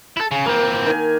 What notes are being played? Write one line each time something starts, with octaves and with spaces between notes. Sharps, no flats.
E4 A4
C#3
E3 A#3 C4
D#3 G#5